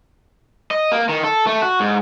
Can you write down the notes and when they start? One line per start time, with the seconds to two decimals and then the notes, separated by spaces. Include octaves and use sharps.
0.71 D#5
0.92 A#3
1.09 D#3
1.24 A4
1.47 A3
1.62 F#4
1.80 G#2